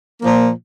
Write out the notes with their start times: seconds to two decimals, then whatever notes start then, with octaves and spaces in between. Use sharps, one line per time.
0.21 A#2 F3 A#3